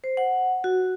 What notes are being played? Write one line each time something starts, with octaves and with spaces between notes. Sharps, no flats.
C5
F#5
F#4